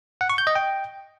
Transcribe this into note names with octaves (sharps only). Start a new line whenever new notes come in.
F#5
C#6
G6
D#5
G5